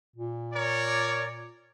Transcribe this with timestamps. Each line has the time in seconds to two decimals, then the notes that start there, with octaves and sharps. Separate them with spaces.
0.16 A#2
0.54 A#4 C#5 D5